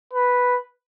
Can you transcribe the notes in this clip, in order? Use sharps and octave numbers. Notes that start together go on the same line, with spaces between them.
B4